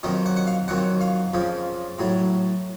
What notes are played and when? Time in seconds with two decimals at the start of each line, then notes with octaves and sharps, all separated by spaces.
0.03 F2 D#3 F#3 D#5
0.26 F#5
0.36 F#5
0.47 F5
0.68 F2 D#3 F#3 F#5
1.01 F5
1.33 F2 C#3 F3
1.99 A2 F#3